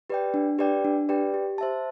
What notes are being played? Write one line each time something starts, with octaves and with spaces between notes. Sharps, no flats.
G4 B4 D5 G5
D4
G4 B4 D5 G5
D4
G4 B4 D5 G5
G4
C5 E5 A5